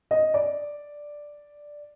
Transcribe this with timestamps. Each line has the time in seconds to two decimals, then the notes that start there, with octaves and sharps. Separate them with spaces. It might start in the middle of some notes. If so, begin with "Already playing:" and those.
0.11 D#5
0.34 D5